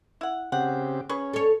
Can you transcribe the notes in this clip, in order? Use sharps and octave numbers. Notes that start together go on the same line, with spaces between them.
E4 F#5
C#3 C4 G4 F#5
C#4 G#4 B4 C#6
A4 C#5